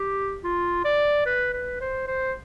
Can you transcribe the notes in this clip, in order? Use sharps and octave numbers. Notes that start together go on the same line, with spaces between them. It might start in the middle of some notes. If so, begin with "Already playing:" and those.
Already playing: G4
F4
D5
B4
B4
C5
C5